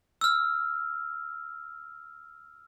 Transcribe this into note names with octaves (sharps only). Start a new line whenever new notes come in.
E6 F6